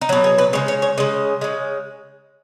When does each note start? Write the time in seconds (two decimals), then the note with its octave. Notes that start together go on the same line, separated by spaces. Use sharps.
0.01 D#4
0.09 F#3 F#4
0.12 B2
0.24 G#4
0.38 B4
0.53 C#3 G#3 C#5
0.68 C#5
0.82 C#5
0.98 C#3 G#3 D#5
1.41 C#3 G#3